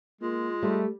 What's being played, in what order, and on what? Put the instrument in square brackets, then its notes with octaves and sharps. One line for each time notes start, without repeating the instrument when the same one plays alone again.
[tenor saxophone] G#3 [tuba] A#3 [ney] F4
[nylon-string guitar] G3 [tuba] A3